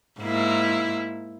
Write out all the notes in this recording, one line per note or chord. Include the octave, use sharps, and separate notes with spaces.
G#2 A#3 E4